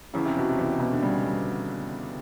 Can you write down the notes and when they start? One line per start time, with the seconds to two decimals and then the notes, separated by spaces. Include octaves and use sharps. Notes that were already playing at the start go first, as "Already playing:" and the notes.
0.14 E2 C#3
0.25 C3
0.37 E2 B2
0.49 C3
0.59 E2
0.80 B2
0.92 D3
1.02 C#3 G3
1.24 G3